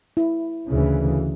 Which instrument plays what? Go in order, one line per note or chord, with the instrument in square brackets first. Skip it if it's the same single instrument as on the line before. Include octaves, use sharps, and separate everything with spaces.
[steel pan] E4
[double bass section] D2 C#3 E3